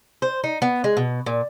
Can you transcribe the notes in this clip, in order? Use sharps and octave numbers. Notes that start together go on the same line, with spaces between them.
C5
D#4
B3
G#3
B2
A#2